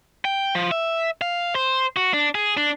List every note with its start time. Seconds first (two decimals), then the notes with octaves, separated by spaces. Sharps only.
0.25 G5
0.55 F3
0.71 E5
1.21 F5
1.55 C5
1.97 F#4
2.13 D4
2.35 G#4
2.57 D4